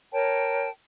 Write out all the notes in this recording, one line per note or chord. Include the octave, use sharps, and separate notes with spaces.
A#4 C#5 G5 A5